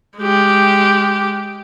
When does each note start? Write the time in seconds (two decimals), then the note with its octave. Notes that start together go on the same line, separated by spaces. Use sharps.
0.18 G#3 G4